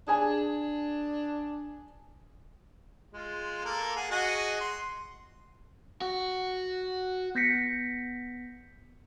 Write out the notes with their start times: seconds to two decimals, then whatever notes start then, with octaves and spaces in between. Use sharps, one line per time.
0.08 D4 G#4 G#5
3.13 G#3 F4
3.65 A#3 A4 A#4
3.96 G#4 F#5
4.11 F#4 G#4 D#5
4.61 C6
6.01 F#4
7.35 B3 G6 A#6 B6 C#7